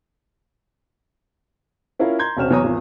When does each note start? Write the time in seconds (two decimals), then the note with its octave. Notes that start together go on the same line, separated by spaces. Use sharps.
1.99 C#4 E4 F4 A#4 F5
2.19 A#5 C6 G6 G#6
2.37 E1 C3 C#4 F6 E7
2.50 E2 F#3 B3 C#5 A#5 D#6
2.64 G#1 E2 F4